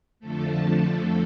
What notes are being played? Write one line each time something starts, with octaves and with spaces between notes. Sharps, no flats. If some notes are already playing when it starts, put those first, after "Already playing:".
F2 D3 F3 A3 A4